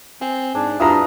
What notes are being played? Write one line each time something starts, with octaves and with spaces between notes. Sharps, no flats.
C4 G#5
G#2 D4
G2 E4 F4 D5 A#5 D#6